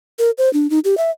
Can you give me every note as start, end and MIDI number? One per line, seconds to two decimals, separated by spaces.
0.19 0.31 70
0.38 0.52 72
0.53 0.70 62
0.70 0.79 63
0.84 0.97 67
0.98 1.10 76